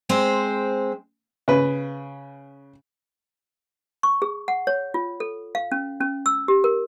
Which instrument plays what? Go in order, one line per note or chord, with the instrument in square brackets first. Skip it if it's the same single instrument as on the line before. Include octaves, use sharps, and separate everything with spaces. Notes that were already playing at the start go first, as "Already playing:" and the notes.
[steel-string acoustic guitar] G#3 C4 C5
[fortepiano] C#3 B4
[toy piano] C#6
G#4
F#5
C#5
F4
A4
F5
C#4
C#4
E6
G4
A#4